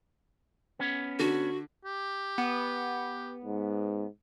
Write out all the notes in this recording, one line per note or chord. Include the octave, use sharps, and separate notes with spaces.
B3 C#4
D3 F#4
G4
B3
G#2